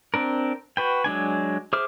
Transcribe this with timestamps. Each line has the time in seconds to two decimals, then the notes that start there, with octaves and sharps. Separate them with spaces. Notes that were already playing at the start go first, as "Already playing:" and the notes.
0.14 C4 D4 A#4
0.77 F#4 B4 G5
1.04 F#3 G#3 D4 G#5
1.73 G#4 C5 E5 D6 F6